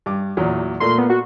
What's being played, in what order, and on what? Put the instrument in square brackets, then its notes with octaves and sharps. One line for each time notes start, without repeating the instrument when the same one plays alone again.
[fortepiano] G2 D6
E2 A#2 F#3
[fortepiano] A#2 A3 A#3 [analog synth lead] C6
[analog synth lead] B3
F#4